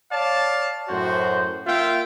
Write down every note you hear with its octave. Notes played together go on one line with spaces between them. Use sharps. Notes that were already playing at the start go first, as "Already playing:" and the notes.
C#5 D5 F5 A5
F#2 A2 F#4 C5
A#3 F4 E5 F5 G5